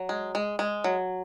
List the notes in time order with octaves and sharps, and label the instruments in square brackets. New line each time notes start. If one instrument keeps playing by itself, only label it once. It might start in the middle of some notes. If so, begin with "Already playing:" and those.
Already playing: [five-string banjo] F#3
G#3
G#3
G#3
F#3